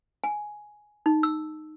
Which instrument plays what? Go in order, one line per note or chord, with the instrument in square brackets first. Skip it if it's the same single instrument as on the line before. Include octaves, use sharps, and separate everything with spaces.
[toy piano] G#5
D#4
E6